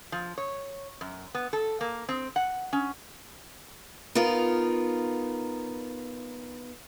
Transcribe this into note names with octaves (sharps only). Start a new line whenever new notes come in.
F3
C#5
F#2
B3
A4
A#3
C4
F#5
C#4
B3 D#4 F4 A#4